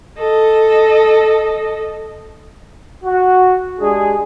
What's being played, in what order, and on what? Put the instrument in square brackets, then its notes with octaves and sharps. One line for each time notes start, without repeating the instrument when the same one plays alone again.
[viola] A4 D#5
[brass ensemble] F#4
G#3 D4 G4 G#4